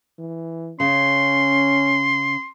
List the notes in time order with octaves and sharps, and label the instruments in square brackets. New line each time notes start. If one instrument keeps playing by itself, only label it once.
[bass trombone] E3
[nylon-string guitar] C#3 [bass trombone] C#4 [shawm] C6